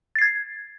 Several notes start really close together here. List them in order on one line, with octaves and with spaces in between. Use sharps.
A6 C7 G#6